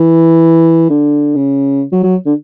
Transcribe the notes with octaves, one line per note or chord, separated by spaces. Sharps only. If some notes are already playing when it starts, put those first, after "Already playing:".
Already playing: E3
D3
C#3
F#3
F#3
D3